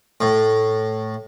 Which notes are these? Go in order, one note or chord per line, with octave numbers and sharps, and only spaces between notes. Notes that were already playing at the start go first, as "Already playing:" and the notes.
A2